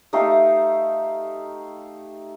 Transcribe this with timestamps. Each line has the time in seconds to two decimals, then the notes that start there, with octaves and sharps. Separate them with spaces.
0.13 A3 D#4 G4 F5